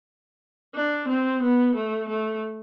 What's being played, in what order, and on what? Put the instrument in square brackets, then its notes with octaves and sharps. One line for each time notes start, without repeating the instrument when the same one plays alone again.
[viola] D4
C4
B3
A3
A3